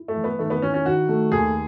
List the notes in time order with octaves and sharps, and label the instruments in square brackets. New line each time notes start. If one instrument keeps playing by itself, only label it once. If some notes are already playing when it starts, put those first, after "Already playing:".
Already playing: [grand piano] E4
[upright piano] A3
[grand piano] E3
[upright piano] B3
[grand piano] D#3 [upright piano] A3
[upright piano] B3
[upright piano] C#4 [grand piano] E4
[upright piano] C#4
[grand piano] D#3 [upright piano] F#4
[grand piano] A3
[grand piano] D#2 [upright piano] G#4